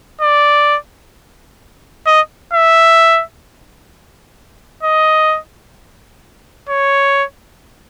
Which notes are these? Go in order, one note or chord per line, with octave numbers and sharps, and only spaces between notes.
D5
D#5
E5
D#5
C#5